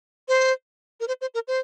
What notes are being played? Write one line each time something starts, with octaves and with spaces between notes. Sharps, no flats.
C5
A#4
C5
C5
A#4
C5